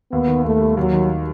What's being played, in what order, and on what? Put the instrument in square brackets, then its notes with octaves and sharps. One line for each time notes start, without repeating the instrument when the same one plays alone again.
[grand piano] D#2 [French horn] B3
[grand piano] D#3
[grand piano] D#2 [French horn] A3
[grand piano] G3
[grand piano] D#2 [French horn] F#3
[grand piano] D#3